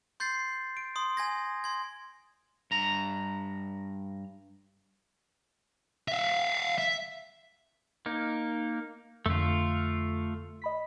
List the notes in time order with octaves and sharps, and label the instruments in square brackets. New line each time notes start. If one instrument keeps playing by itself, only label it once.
[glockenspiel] C6 G6 A6 C7
D7
C6 D#6
G#5 G#6 A#6
C6 G#6
[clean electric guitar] G2 A#5
[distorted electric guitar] E5 F5
E5
[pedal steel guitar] A#3 D#4
[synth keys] F2 D3 [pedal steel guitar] A3 F4
[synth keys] D#5 B5 B6